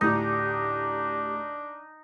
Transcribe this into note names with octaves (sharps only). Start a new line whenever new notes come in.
D2 A2 D4 D#4 G4